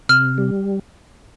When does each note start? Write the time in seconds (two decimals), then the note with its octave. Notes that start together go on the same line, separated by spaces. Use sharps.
0.09 C3 F6
0.38 G3